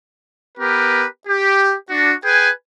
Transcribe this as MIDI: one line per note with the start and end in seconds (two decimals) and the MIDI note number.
0.58 1.06 59
0.58 1.06 67
0.58 1.06 70
0.58 1.06 71
1.27 1.74 67
1.90 2.12 62
1.90 2.12 66
2.25 2.49 68
2.25 2.49 71
2.25 2.49 79
2.25 2.49 80